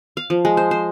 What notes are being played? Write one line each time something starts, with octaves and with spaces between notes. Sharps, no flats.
F5
F3
G#3
C5
C5